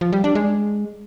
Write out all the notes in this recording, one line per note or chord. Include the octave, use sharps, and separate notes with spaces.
F3
G3
D4
G#3